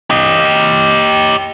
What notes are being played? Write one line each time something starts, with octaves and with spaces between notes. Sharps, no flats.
G4 D#5